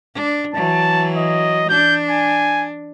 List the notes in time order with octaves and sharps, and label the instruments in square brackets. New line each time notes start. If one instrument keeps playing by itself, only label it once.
[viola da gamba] D4
[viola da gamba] E3 F#3 [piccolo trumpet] A5
[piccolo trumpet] D#5
[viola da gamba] D4 [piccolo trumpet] G6
[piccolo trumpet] G#5